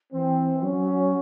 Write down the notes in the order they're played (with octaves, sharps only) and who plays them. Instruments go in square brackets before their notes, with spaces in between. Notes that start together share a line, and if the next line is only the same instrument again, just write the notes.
[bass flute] E3 [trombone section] C4
[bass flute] F#3 [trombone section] C#4